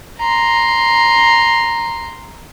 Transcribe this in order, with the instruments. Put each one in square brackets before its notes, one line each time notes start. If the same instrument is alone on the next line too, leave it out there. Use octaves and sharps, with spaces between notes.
[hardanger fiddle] A#5 C6